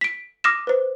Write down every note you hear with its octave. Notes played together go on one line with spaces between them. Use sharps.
B6 D7
D6 D#6 F6 A#6 E7
B4 C5